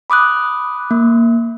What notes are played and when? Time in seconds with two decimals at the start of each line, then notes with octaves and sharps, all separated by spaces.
0.10 B5 D6 D#6 F#6
0.91 A#3